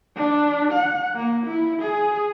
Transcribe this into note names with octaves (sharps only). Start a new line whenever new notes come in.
D4
F#5
A#3
E4
G#4